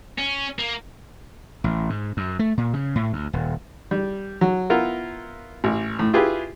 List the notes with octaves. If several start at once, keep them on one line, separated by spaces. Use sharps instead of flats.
C#4
A#3
A1
G#2
F#2
A3
A#2
C#3
A2
D2
D#1
G3
F#3
B3 E4 F4 A#4
A1
A2
E4 F4 G4 G#4 B4